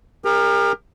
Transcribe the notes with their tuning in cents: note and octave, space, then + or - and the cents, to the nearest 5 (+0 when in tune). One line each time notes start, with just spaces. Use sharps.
G4 +40 A#4 +0